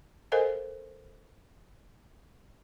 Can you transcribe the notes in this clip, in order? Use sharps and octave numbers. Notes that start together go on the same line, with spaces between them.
A4 A#4 C5 D#5 F5 G#5